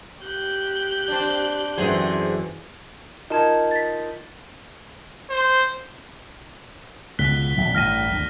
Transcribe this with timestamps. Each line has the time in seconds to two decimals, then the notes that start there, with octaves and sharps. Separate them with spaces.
0.22 G4 F#6 G6
1.08 C4 D4
1.78 F#2 D3 E3 C4 G#4
3.30 D#4 F4 A#4 A5 G#6
3.71 A6 B6
5.30 C5
7.19 C#2 B2 F#6 B6 G7
7.58 D#1 A#1
7.75 A1 G2 F6 A#6 D#7
8.11 D2